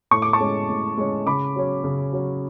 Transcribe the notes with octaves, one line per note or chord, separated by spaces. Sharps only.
A2 C#6
D6
A5 C#6
G#3 C#4
A2
G#3 C#4
C#3 B5 D6
F#3 C#4
C#3
F#3 C#4